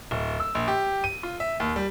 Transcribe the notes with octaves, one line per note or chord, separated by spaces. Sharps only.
D1
E6
A#1
G4
D#7
F4
E5
D#2
G3